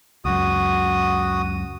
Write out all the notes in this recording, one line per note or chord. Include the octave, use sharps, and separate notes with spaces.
C#2 F#2 F#4 D#6